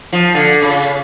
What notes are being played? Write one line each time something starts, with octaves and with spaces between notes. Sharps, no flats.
F3
D3
C#3